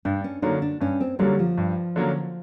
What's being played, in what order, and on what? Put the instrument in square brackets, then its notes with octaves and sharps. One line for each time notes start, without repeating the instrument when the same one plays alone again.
[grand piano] G2 [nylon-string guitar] D4
[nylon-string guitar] C#4
[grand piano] D3 F#3 A#3 C#4 [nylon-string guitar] D#4
[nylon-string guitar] D4
[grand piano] G2 [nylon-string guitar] C#4
[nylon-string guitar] C4
[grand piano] D3 F#3 A#3 C#4 [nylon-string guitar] G3
[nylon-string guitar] F3
[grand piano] G2
D3 F#3 A#3 C#4